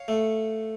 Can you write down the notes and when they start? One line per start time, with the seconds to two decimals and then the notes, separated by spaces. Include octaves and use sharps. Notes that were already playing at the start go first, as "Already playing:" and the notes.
Already playing: C#5 F5
0.08 A3